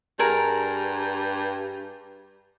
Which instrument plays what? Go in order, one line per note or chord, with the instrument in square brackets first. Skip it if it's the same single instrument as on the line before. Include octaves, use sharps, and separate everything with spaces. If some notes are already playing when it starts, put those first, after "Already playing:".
[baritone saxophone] G2 [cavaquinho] G#4 A#4